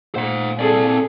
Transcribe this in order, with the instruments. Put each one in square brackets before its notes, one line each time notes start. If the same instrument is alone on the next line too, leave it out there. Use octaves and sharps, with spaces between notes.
[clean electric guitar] A#2 [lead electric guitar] C5 F#5
[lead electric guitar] C4 D5 [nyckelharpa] G#4 [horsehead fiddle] A4